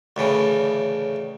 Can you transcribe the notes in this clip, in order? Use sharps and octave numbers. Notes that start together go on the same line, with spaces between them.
D2 A2 C#3 E3